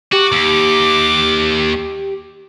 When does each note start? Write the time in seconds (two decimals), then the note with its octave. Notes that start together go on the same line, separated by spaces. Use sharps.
0.12 F#4 G4 D6
0.32 D#2